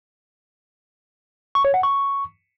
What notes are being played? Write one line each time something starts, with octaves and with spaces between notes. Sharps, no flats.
C#6
C#5
F#5
C#6